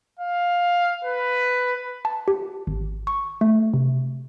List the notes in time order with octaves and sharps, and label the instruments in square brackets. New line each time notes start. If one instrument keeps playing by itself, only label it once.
[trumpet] F5
B4
[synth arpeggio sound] A5
G4
G#1
C#6
A3
C3